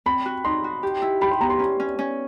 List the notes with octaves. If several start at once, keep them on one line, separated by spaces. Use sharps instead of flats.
C4 B5
F#4
D#4 C6
F#4
G4
E4
G4 B5
C6
B3 A#5
C6
C#4
C#4
C#4